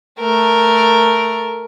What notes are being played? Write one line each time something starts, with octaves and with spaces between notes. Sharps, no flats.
A3 A#4